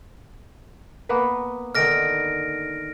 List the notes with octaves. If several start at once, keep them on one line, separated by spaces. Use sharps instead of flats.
A#3 B3 B4
D3 D#3 F6 A#6 D7